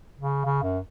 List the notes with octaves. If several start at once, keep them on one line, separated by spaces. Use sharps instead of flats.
C#3
C#3
F#2